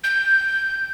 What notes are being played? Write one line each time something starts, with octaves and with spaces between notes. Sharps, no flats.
G6